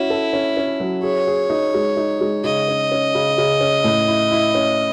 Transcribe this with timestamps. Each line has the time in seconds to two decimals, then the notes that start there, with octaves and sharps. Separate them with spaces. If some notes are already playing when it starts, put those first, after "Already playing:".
Already playing: C#4 E4 F#4
0.10 A4
0.33 C#4
0.57 C#4
0.80 F#3
1.03 G#4 C#5
1.27 G#4
1.50 D#4
1.74 G#3
1.97 D#4
2.21 G#3
2.44 C#3 D#5
2.68 C#4
2.92 C#4
3.15 C#3
3.38 C#3
3.61 C#4
3.84 A2
4.08 E4
4.32 E4
4.55 C#4